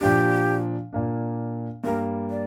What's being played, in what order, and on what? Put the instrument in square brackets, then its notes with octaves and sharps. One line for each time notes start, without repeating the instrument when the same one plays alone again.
[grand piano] A#2 F3 D4 [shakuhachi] G4
[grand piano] A#2 A#3 D4
[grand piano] G2 G3 A#3 [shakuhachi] A#4
[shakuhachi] D5